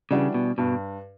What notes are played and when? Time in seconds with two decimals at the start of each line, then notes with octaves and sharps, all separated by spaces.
0.11 C#3 E3 G3 D4 F#4
0.34 B2
0.58 G2 B2